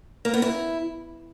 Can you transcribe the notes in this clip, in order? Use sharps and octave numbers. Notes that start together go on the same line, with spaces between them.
A#3
B3
E4